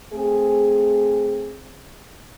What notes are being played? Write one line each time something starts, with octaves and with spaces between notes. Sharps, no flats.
A3 C4 G#4